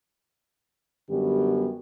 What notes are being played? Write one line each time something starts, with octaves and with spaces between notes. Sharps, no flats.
F#2 D3 G3 B3 G4